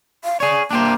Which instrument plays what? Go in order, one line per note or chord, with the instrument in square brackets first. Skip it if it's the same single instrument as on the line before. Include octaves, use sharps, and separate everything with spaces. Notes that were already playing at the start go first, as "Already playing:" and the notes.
[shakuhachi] F5
[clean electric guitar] G#4 C#5 [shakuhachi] D5
[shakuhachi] A#3 [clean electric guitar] D4 G4 C5